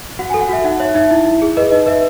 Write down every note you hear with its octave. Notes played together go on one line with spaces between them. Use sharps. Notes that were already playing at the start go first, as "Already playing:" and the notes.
F#4 F#5
G#5
A4
F#5
F#4 E5
D#4 F#5
C#5 E5
D#4 E5
E4
E4
G#4
B4 D#5
D#4 D#5
B4 E5